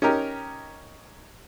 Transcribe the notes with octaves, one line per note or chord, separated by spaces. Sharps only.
C#4 D#4 G4 A#4